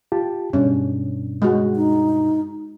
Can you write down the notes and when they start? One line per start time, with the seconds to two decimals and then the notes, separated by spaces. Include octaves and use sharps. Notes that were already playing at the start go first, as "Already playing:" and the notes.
0.12 F4 G4 A5
0.53 G2 B2 C#4 D4
1.42 G#3 F#4
1.76 D#4